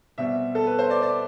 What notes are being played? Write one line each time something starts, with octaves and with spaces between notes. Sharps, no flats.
B2 G3 C4 E5
A4
B4
C5
D5
D5